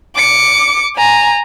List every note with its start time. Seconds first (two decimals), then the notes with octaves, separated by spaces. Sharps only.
0.16 D6 C#7
0.97 G#5 A#5